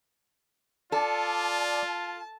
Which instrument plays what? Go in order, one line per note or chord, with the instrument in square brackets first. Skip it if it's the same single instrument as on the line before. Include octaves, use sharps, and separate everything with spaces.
[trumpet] F4 [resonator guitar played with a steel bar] A4 [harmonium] D5 [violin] A5